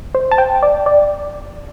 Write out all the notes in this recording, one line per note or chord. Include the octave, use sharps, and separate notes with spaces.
C5
A5
G5
D5
D5